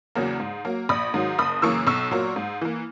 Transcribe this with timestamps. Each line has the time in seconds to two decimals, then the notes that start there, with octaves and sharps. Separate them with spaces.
0.15 E2 C#3 F#3 A#3
0.40 G#2
0.65 F#3 A#3
0.89 A#1 B5 D#6
1.14 G#2 D#3 F#3
1.38 F#1 B5 D#6
1.62 F#2 C#3 E3 A#3 C#6 E6
1.87 B1 C#6 E6
2.11 A#2 F#3 A#3
2.36 G#2
2.61 E3 A#3